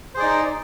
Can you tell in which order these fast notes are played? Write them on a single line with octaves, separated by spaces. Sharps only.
C5 G#4 D5 D#4